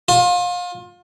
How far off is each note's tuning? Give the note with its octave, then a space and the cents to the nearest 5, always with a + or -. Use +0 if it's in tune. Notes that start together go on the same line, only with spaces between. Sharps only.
F4 +30